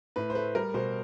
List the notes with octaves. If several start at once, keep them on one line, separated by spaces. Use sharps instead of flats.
A2 B4
C5
A3 B4
G3 A#4
B2 C5